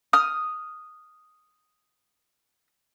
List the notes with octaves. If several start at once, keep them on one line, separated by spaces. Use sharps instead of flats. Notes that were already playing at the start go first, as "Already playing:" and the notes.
D#6 F6